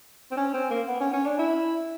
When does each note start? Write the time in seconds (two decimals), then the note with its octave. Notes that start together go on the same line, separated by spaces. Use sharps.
0.31 C4
0.37 C#4
0.54 C4
0.70 A#3
0.88 B3
1.00 C#4
1.13 C#4
1.25 D4
1.39 E4